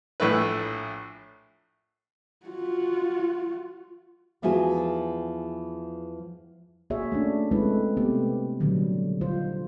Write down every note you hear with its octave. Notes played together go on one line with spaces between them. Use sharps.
A#1 A2 A3 E4 B4
F4 F#4
E2 E3 F3 F#4 G#4 G#5
A#3 F#4 G#4 C#5 E5
A3 C#4 D4
G#3 A3 C4 E4 A4 B4
C3 A3 B3 C4 G4
A#2 D3 D#3 F#3 G3
D3 D#4 F4 C5